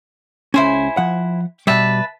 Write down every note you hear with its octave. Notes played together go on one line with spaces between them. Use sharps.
C#2 C#4 E4 C5 G#5
F3 F#5
B2 G3 B4 E5 A5